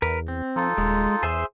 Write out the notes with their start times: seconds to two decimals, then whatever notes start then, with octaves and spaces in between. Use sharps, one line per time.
0.02 E2 A#4 B4
0.28 C4
0.56 F3 D#4 F4 A4
0.78 D#1 G#3
1.23 E2 G#4 C5 E5